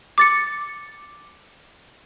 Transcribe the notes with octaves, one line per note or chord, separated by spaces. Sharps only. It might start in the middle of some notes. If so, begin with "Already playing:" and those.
D6 A6 C#7